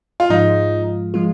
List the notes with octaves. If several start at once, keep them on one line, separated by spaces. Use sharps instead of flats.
F4
G#2 F3 G#3 D#4 F4
F3 G#3 F4